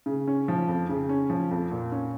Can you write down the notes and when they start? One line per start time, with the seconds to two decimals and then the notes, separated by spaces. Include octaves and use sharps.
0.06 C#3
0.28 C#4
0.48 F3
0.68 F2
0.89 C#3
1.09 C#4
1.30 F3
1.51 F2
1.71 A#2
1.92 C#4